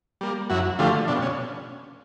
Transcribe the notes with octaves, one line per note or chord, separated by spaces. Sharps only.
G3 A#3
F#2 E4 F#4
D3 F3 A3 F4 G4
B2 D4
C#4